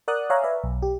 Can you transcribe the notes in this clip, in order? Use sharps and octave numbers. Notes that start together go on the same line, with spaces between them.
A#4 D5 F#5 D#6 F#6
C#5 E5 F5 G#5 A#5
B4 D5 E5
B1
G4